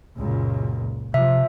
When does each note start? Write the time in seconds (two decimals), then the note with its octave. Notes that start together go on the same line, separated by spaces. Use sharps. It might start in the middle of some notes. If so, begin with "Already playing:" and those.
0.20 C#2 F#2 A#2
1.14 C3 F3 E5